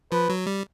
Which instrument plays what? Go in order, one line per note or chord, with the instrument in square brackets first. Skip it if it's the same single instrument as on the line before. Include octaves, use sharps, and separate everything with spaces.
[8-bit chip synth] F3 [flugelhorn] B4
[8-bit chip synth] F#3
G3